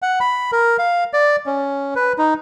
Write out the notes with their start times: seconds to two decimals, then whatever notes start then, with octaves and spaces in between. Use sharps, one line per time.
0.02 F#5
0.20 B5
0.52 A#4
0.79 F5
1.13 D5
1.46 C#4
1.96 B4
2.18 D#4